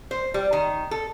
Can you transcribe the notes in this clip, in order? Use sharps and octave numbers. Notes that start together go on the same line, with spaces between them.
C5
G3
D#3
A4